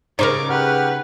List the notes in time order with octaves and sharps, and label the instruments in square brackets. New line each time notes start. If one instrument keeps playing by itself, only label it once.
[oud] C#3 D#4 [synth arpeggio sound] A#4 C5 [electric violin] C#6 D6
[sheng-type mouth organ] G4 F#5 F6 [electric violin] B4